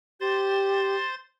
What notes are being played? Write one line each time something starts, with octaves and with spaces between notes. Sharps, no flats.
G4 C5 C6 A6